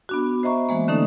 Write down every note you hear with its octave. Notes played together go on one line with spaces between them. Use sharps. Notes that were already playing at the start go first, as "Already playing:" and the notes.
B3 D4 F#4
C5 D#5 E5 A#5 C#6
E3 G#3 A#3
D3 A3 C#4 D#4 A4